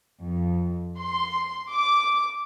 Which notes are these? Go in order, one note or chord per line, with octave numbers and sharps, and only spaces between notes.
F2
C6
D6